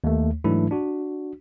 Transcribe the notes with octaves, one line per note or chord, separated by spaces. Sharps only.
D#2 A3
G#2 E3 F#3 A3 D4 E4
D4 F#4